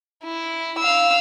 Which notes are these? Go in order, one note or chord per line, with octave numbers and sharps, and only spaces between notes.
E4
F5 E6